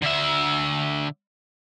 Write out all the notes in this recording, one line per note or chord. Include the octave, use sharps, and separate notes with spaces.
D3 E5